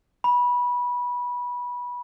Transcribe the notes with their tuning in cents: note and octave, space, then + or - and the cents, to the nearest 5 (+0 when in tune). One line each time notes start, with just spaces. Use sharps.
B5 -20